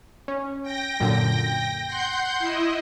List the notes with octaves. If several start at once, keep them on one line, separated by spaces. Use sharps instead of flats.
C#4
G5 A#6
F#2 A#2 D3
F#5 C6 G6
E4 D#5